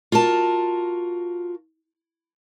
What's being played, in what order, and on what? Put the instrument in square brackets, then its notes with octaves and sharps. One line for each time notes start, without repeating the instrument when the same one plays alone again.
[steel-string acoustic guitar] F4 F#4 A#4 A5